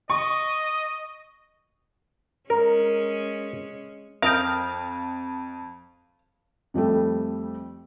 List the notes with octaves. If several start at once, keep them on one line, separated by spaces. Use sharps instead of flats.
D#5 C#6
G#3 C#4 A#4
F2 A#4 D#5 F5 G5
F2 F3 G3 A3